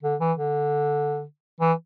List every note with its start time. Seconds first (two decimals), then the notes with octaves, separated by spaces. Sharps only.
0.03 D3
0.20 E3
0.38 D3
1.60 E3